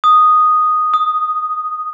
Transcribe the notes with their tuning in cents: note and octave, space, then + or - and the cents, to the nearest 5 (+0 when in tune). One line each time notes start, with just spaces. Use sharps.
D#6 -5
D#6 +15